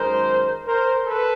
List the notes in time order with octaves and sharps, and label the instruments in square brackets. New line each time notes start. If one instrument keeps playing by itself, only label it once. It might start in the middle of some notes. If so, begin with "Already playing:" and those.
Already playing: [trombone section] F#2 D#3 G#3 A#4 C5
A#4 C5
A4 B4